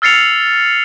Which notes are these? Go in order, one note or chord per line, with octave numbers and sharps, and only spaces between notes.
E6 F6 A6 C7 C#7 F7